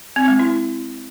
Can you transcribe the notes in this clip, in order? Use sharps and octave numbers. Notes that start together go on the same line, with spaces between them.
C4
G#3
E4